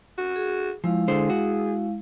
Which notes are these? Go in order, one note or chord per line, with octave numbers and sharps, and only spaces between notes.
F#4
G#4
F3 G#3 E4 F5
D3 G#4 C5
F#4